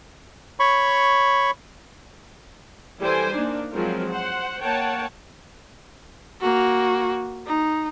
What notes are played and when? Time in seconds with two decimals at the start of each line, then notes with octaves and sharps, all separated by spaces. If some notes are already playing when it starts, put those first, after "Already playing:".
0.60 C#5 B5 C#6
3.00 E3 G3 A4 C5 G5 G#5
3.33 A#3 D4 D#4
3.72 F3 F#3 G#3 C4 F4 A#4
4.10 C5 F#5
4.62 A#3 C#5 F#5 G5 A5
6.41 A#3 F#4
7.47 D#4